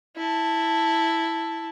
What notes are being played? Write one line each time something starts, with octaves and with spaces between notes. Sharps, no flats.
E4 A5